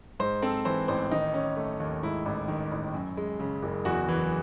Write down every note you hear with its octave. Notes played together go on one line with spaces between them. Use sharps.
G#2 C5
C4 A4
E3 C5
A1 C5
D#3 D#4
C#4
A3
D#2
G#2 E4
A1
D#3
A1
F#2
G#3
C#3
F#1
E2 F#4
E3